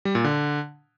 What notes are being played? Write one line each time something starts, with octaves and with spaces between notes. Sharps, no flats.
G3
A#2
D3